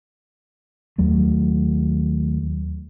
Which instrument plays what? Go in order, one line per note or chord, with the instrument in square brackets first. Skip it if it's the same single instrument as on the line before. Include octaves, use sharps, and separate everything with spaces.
[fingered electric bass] D#2 F#3 A3